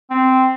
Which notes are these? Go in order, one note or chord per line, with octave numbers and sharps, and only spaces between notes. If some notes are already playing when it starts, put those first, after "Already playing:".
C4